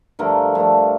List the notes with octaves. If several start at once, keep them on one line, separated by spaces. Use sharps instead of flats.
G2 D3 F3 A3 A#4
G2 D3 F3 A3